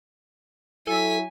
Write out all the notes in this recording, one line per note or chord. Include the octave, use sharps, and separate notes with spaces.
F#3 E4 A4 G#5 B6